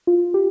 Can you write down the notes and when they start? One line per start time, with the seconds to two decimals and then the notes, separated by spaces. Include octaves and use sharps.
0.07 F4
0.34 G4